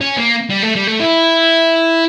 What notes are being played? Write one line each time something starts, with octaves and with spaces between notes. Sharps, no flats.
C#4
A#3
G3
A3
G3
A3
E4